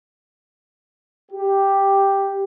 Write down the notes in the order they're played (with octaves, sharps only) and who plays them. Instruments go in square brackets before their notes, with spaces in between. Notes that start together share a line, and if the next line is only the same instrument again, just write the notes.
[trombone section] G4